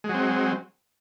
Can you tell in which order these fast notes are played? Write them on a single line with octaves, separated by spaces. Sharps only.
G#3 F#3 C4